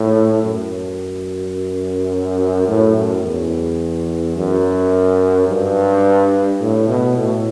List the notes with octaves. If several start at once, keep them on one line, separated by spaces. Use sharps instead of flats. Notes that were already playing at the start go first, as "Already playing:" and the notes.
Already playing: A2
F#2
A2
F#2
E2
F#2
G2
A2
B2
A2